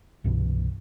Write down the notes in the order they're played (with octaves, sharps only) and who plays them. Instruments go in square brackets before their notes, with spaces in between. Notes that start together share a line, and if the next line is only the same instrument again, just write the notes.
[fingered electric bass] C2 G2 B2 E3